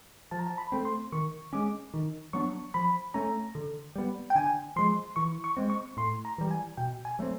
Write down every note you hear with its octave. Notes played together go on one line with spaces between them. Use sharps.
F3 A5
A#5
A5
B5
A3 C4
C6
D#3 C#6
G#3 C#4 D6
D#3
F#3 B3 D4 C#6
F3 B5
A3 C#4 A#5
D3
G3 B3
G5
D3 G#5
F3 G#3 C6
E3 C#6
C#6
G#3 C4
C#6
A2 C6
A#5
E3 G3
G#5
B2 G5
G#5
F#3 A3 C4